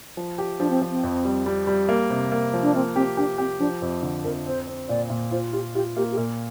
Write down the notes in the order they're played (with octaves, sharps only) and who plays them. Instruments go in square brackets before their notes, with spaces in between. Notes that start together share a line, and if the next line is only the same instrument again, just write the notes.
[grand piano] F3
G4
[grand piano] F3 [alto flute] D4
[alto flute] C4
[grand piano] F3
[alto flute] C4
[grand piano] F2
G3
G3
G3
A#3
C3
A#3
F3
[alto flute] D4
[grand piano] A#3 [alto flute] C4
[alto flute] C4 [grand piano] G4
[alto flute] D4 [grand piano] G4
[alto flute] C4 [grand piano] G4
[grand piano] F3 [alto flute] D4
[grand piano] F2
D3
[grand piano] F2 [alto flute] A#4
[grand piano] C4 [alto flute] C5
[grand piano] C4
[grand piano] A#2 [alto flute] D5
[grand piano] A#2
[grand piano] F4 [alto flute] C5
[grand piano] F4 [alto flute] G4
[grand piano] F4 [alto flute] G4
[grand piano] A#3 [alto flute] G4
[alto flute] G4
[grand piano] A#2 [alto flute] A#4